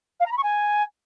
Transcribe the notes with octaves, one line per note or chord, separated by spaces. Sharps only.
F5
A#5
B5
C#6
G#5